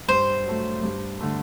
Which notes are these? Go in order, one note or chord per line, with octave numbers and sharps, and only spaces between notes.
G2 C5
F#3 A3
G2
D3 A3